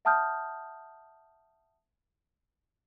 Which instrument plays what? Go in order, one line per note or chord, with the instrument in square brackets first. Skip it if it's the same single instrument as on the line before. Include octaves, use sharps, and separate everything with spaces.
[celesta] E5 F#5 A5 D#6 F6 G6